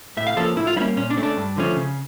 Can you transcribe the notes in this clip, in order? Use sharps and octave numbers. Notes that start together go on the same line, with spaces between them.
A2 E5
F5
F3 A#3 C#4 A4
A2 E4
F4
G3 A#3 C#4 E4
A#2 C#4
D4
A3 C#4
D4
G2
D3 F3 A3 C#4
C#3